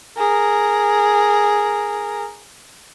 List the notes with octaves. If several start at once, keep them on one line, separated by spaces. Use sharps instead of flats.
G#4 A#4